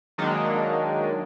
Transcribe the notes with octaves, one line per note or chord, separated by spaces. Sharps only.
D#3 F#3 G#3 A#3 D4 D#4